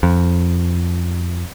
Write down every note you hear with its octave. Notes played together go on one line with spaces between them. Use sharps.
F2